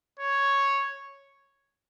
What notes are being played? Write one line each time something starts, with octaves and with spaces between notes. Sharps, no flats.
C#5